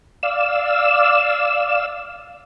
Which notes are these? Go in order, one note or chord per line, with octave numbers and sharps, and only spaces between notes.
D5 F5 E6